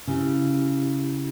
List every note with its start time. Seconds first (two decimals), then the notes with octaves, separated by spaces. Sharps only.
0.07 C#3 C#4 E4 G4